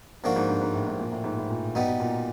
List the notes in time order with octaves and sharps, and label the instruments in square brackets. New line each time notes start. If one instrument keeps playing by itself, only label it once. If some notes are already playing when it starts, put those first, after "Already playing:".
[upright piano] G#2 [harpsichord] F3 A#3 D4 F#4
[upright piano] G#2
G2
G#2
A2
G#2
A#2
A2
G#2
A2
A#2
[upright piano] B2 [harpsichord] G3 B3 D#4
[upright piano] B2
A#2